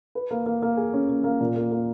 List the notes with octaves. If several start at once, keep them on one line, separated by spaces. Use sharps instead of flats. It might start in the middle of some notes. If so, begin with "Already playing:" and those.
B4
A#3
A#3
A#3
G#4
C#4
A#3
A#3
A#2
A#3
A#3